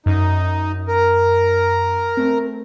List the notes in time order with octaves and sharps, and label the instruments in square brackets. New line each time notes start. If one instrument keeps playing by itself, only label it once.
[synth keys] F#2 [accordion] D#4
[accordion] A#4
[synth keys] A3 C4